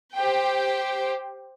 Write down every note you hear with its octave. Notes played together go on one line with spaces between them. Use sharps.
G4 C5 G5